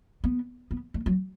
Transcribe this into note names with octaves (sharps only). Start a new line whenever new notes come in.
B3
B3
A3
F#3